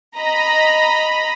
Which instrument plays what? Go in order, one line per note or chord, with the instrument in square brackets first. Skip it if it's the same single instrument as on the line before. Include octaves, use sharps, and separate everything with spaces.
[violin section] D#5 A#5 B5